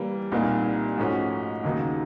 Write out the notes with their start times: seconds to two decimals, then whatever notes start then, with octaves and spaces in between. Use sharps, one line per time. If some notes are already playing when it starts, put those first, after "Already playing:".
Already playing: E3 G3 A#3
0.32 C2 A#2 G3 A#3 D#4
0.98 G#2 F3 A3 C#4 F#4
1.64 D#2 C#3 F#3 A#3 D#4